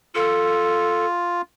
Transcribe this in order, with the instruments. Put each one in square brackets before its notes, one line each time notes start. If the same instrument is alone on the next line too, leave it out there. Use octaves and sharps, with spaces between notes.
[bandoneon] F4 [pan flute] A4